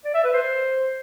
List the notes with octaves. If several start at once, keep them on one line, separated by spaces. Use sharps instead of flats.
D5
E5
B4
C5